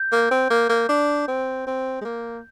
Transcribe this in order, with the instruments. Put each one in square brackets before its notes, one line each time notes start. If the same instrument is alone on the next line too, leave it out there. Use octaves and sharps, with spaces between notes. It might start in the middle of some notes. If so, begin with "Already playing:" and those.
Already playing: [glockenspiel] G6
[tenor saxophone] A#3
C4
A#3
A#3
D4
C4
C4
G#3
A#3